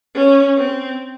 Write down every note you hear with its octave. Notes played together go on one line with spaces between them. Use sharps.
C#4
C4